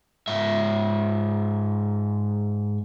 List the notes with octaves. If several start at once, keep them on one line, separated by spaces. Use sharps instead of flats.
G#2 E5